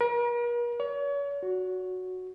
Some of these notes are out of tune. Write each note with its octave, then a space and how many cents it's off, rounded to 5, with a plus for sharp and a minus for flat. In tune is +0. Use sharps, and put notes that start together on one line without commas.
A#4 +45
C#5 +40
F#4 -5